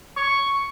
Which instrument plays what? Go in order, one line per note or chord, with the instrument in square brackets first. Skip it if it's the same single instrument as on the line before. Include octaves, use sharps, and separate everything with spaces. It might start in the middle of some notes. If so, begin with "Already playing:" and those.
[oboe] C#6